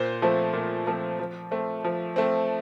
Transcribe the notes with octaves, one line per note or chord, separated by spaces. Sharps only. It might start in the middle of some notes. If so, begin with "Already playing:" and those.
Already playing: A#2 C5
F3 A3 C4
A#2
F3 A3 C4
F3
A3 C4
F3
A3 C4